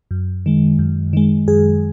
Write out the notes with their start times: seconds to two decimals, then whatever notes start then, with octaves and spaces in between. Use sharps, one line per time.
0.11 F#2
0.46 D#3 G#3
0.79 F#2
1.13 D#3 G#3
1.48 F#2 G#4